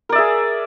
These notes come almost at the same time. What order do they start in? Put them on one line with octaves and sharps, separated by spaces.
A#4 D5 E5 G#4